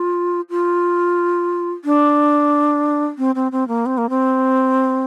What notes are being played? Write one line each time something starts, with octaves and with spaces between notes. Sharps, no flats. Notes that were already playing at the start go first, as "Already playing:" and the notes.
Already playing: F4
F4
D4
C4
C4
C4
A#3
C4
A#3
C4